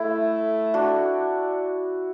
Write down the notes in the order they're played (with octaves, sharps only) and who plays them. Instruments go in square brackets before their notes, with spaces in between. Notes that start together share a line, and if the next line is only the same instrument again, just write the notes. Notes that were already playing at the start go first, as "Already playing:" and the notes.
Already playing: [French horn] A3 [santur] E4
[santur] D4 F#4